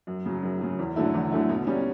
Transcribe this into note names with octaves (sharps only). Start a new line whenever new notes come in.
F#2
C#3 F#3
F#2
C#3 F#3
E2
D3 F#3 A3 E4
E2
D3 F#3 A3 E4
B2
G3 C#4